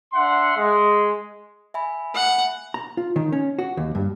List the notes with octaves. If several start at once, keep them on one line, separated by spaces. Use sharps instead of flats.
D4 E5 F#5 C6
G#3
E5 G#5 B5
F#5
A#5
F4
D#3
C#4
F#4
D#2
G2